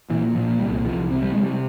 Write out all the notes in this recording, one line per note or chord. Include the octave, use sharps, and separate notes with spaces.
A#2 E3
A#2 F3
C2 G3
C2 F3
C3
G3
C3 G#3
G3